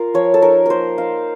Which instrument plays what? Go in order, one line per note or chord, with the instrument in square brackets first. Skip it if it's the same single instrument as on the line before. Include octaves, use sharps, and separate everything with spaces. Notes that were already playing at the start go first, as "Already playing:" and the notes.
Already playing: [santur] F4 A#4
F3 C#5
A4
D#4 A#4
A#3 A#4 C5
D#4 F5